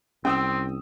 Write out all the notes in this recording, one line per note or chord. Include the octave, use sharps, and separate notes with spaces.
C2 C4 C#4 G5 D#6 E6